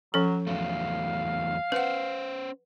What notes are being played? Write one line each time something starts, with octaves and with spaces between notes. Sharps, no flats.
F3 F#3 C#4 A4
E2 F#3 A3 F5
C#4 B4 C5 F#5